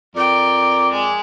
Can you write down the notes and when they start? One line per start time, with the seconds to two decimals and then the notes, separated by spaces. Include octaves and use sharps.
0.15 F2 A#4 D5 G5
0.90 G#3